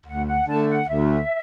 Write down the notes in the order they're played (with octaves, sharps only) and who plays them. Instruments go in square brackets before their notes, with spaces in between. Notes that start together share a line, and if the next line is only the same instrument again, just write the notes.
[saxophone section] D2 [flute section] F#5
[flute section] F#5
[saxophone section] D3 A3 [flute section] A5
[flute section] F#5
[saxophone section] D2 [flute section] E5